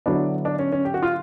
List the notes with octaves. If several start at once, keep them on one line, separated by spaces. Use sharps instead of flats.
D3 F#3 B3 D4 E4
D4
C#4
C#4
G4
F#4
F4